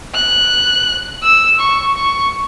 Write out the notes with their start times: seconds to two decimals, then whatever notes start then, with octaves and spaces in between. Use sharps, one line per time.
0.15 F#6
1.23 E6
1.60 C#6
1.96 C#6